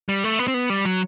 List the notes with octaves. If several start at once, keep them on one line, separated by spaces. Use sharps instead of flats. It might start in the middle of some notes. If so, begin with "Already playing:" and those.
G3
A3
B3
C4
B3
G3
F#3